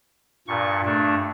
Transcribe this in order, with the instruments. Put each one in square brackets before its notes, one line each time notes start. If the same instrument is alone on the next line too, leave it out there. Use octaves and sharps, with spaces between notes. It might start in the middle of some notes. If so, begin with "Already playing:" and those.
[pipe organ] G2 A#2 C#6
G2 A3 D4